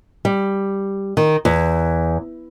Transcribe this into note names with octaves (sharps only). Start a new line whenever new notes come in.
G3
D#3
E2